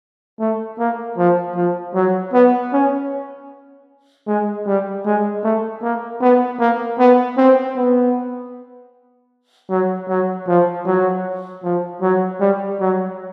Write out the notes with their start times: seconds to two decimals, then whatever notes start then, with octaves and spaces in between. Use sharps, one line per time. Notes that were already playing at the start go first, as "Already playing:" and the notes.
0.40 A3
0.79 A#3
1.17 F3
1.56 F3
1.94 F#3
2.33 B3
2.72 C#4
4.27 G#3
4.66 G3
5.05 G#3
5.43 A3
5.83 A#3
6.21 B3
6.59 A#3
6.99 B3
7.37 C4
7.76 B3
9.70 F#3
10.09 F#3
10.47 F3
10.86 F#3
11.63 F3
12.02 F#3
12.40 G3
12.80 F#3